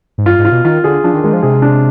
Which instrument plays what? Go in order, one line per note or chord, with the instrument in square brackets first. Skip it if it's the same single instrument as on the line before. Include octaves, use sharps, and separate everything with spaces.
[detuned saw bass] G#2
[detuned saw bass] G2 [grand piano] F4
[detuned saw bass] G#2
[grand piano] F4
[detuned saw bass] B2
[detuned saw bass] D#3 [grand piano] F4
[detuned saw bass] D3 [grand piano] G#4
[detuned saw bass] F3 [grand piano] D4
[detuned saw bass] D#3
[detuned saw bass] D#3 [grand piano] G#3
[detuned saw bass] F3
[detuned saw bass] C3 [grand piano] G#4
[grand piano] D4